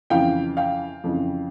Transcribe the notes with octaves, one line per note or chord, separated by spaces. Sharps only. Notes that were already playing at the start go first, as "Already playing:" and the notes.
F2 C#3 E3 F5 G5
F5 G5
F2 C#3 E3